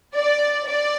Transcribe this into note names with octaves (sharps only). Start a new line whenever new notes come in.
D5
D5